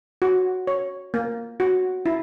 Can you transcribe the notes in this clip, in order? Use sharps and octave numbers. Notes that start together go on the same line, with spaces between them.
F#4
C#5
A#3
F#4
E4